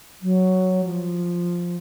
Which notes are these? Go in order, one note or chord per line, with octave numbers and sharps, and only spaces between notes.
F#3
F3